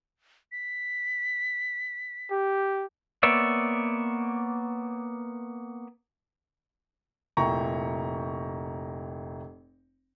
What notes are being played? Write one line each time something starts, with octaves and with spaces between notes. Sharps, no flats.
B6
G4
A#3 B3 C#5 D5 E5
F1 A#2 E4 G5 A#5 C#6